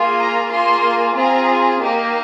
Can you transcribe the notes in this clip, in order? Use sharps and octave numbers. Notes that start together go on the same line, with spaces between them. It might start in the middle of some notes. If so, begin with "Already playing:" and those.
Already playing: A#3 F4 G#4
A#5
A#3 F4 G#4 C6
C4 F4 G#4 A#5
A#3 D#4 G4